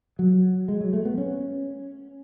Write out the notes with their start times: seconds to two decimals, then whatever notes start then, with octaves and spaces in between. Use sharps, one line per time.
0.19 F#3
0.68 G#3
0.81 F#3
0.93 A3
1.05 B3
1.18 C#4